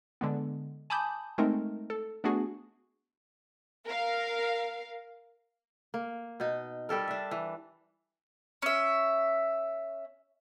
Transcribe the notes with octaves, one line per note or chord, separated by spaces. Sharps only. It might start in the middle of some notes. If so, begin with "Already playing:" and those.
D3 G#3 B3
G#5 A5 B5 D6 D#6 G6
G#3 A3 C4 D#4 A#4
A4
A3 B3 D4 F#4 G#4
A#4 F5
A#3
B2 D#4
G3 G4 A4 A#4
D4 E5
E3
C#4 E5